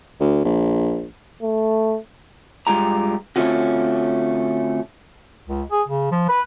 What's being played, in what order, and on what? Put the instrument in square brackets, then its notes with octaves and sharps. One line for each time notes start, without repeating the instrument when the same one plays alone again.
[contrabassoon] D2
A#1
[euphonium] A3
[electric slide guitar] G2 G#3 F4 G4 A#5
D3 A3 C4 C#4 F4 F#4
[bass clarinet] C#2
G#4
C#3
F3
B4